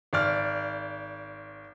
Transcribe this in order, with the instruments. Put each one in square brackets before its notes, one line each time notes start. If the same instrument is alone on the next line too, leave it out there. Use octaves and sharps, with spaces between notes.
[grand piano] G#1 D5 F6